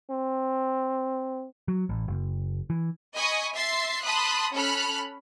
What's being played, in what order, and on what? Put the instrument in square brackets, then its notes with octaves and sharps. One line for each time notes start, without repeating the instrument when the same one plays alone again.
[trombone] C4
[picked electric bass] F#3
A1
F#1
E3
[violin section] D#5 G#5 B5 C#6 D#6
E5 C6 A6 C7
A5 B5 C6 D#6 F#6
C#4 A4 B5 F6 F#6